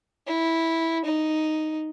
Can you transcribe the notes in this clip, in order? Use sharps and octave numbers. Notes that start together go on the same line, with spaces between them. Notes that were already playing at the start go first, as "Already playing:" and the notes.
E4
D#4